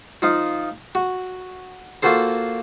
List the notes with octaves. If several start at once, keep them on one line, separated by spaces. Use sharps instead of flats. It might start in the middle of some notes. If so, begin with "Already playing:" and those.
F3 D#4 F4
F#4
A#3 F4 F#4 A4 C5